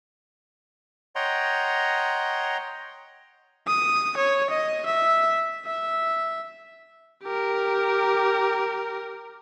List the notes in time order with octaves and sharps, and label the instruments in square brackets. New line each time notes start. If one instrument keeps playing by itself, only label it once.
[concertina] C#5 D#5 F#5 G5 A#5 C6
[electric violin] D#6
C#5
D#5
E5
E5
G4 A#4